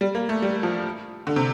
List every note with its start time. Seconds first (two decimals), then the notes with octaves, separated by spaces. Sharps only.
0.01 G3
0.15 A#3
0.29 A3
0.42 G3
0.63 F3
1.27 D3
1.36 C3